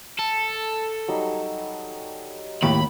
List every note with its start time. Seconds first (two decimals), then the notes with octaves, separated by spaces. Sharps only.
0.19 A4
1.08 F#3 G3 D#4
2.63 D#2 A2 E4 G4 B5